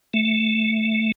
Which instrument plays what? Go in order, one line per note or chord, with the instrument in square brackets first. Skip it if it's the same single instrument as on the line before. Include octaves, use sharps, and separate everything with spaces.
[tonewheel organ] A3